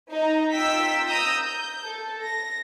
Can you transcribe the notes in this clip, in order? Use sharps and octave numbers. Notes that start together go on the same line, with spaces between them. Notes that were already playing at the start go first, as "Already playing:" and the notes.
D#4 A#5
D#4 F4 G5 E6 B6
A#5 D#6 E6 G6 A#6
G6
A4
A#6